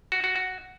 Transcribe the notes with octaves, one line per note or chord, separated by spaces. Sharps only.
F#4
F#4
F#4